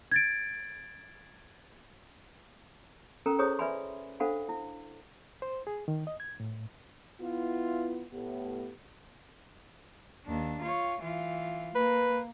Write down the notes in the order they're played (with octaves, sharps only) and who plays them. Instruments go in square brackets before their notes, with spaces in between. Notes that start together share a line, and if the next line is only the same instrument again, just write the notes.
[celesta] G#6 A6 D7
[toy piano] C#4 A4 A#4 G5 A#5
E4 G#4 C5 C#5 C#6 D#6
B4 D5 E5 G#5 B5 C6
D4 A4 C5 F5 F#5 B5
E4
[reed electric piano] C5
G#4
D#3
D#5
G#6
A2
[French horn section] B3 E4 F4
A2 B3 G4
[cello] D#2 D4
F4 C#5
E3 F4
[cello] A#3 [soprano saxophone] B4